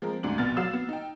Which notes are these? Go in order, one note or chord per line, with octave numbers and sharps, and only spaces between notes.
F3 G#3 C4 A#4
D2 G#2 D4 F#7
A#1 B2 B3 F6 A6
F#3 F#4 F5 E6 E7
B3
D#4 G5